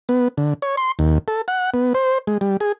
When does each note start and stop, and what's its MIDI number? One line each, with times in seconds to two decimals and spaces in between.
0.09 0.28 59
0.38 0.54 50
0.62 0.76 73
0.77 0.92 84
0.99 1.18 39
1.28 1.42 69
1.48 1.70 78
1.74 1.93 59
1.94 2.18 72
2.27 2.38 56
2.41 2.57 55
2.60 2.72 68